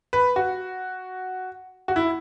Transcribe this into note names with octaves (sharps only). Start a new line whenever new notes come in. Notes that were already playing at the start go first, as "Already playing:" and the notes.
B4
F#4
F#4
E4